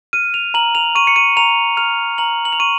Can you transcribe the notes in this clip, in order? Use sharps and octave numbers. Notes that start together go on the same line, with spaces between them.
F6 D#7
F7
A#5 F#7
F7
C#6 D#7
C#7
D#7
A#5 F7
F6 F7
A#5 F#7
F#7
F7
C#6 D#7